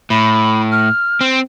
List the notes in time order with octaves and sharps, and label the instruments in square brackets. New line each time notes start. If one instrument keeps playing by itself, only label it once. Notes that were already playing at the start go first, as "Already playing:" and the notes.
[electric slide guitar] A2 [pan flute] B5
[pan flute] F6
[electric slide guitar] C4